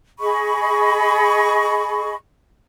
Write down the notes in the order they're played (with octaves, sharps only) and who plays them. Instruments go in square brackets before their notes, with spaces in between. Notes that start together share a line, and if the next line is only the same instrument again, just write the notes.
[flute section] G#4 D#5 B5 C#6